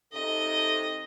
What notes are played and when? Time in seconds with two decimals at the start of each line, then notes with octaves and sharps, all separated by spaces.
0.13 C3 D#4 A4 D#5